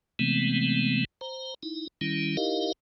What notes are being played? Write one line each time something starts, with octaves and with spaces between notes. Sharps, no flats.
C3 E3 G#3 A3 B3 C4
C5 A#5
D#4 E4
D#3 G3 C#4 E4
D#4 E4 G4 A#4 D#5 F5